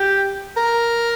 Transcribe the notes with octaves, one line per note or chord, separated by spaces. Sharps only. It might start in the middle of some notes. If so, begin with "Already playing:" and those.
Already playing: G4
A#4